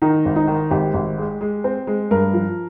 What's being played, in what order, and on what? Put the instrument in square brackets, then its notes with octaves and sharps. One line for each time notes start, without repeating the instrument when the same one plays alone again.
[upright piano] D#3 D#4
G#1
D#4
D#3
G#1 G4
G#1
G#3
G#3
C4
G#3
G2 A#4
F3